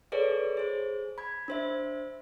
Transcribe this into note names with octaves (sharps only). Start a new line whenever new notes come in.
G#4 A4 B4 C#5 D5
G#4 C5
B5 G#6
D4 C5 E5